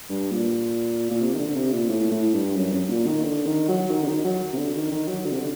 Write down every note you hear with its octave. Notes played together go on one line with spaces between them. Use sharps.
G2
A#2
A#2
C3
D#3
D3
D3
C3
A#2
A2
A2
G2
F#2
F#2
A#2
D#3
D3
D#3
F#3
D#3
D3
D#3
F#3
C3
D3
D#3
D#3
F#3
D3
C3
D3